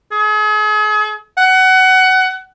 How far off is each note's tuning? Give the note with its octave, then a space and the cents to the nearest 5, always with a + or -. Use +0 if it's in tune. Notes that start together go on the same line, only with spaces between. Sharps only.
G#4 +40
F#5 +20